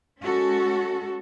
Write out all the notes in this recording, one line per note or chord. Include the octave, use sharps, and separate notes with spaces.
G#3 C#4 F#4 A4